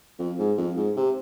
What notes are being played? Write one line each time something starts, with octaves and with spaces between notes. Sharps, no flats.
F2
G#2
F2
G#2
C3